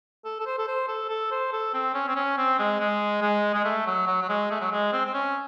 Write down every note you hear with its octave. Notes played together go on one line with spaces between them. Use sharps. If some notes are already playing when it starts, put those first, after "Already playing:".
A4
A4
C5
A4
C5
A4
A4
C5
A4
C4
C#4
C4
C#4
C4
G#3
G#3
G#3
G#3
A3
F#3
F#3
F#3
G#3
A3
F#3
G#3
C4
C4
C#4